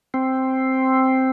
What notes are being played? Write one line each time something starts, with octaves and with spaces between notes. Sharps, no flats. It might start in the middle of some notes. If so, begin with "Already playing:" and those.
C4